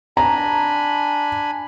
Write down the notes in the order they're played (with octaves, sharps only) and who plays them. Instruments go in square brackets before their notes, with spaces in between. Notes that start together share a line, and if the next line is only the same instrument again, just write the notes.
[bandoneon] D4 G#5 B5 [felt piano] A#5